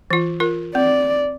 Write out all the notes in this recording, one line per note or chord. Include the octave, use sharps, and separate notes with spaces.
E3 F4
F4 A#4
C4 D5